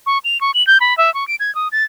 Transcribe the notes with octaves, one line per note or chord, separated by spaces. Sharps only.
C#6
F7
C#6
F#7
G6
B5
E5
C#6
D7
G#6
D#6
A6